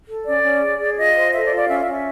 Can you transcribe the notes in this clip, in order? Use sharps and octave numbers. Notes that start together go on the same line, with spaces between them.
A4
C#4 D5
C#4
G#4
G#4
F4 D#5
C5
A4 E5
D5
F4
D5
C#4 E5
E5
C#4
E5